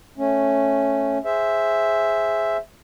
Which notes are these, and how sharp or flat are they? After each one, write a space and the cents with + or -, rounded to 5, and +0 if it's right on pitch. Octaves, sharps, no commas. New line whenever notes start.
A3 +0 C#4 -5
G#4 +0 C5 +0 E5 +0